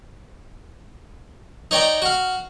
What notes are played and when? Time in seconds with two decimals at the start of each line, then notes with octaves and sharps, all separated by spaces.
1.71 D#4 C#5 D5 G5 A#5
2.02 F#4 F5